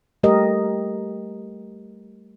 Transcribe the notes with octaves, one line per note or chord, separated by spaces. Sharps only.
G3 A3 G4 A#4 D#5